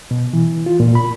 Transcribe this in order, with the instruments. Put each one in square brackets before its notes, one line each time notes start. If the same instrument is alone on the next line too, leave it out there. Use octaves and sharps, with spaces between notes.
[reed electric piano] B2
E3
F4
A#2
B5